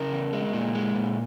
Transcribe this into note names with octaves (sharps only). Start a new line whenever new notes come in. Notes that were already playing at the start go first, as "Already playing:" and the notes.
Already playing: C#3 A#4
E2
G#3
A#2
G#3
A#2